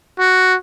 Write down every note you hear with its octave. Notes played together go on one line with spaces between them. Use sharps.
F#4